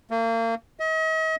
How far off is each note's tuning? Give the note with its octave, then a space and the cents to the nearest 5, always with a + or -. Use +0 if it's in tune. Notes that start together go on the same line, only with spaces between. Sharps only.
A#3 -35
D#5 +40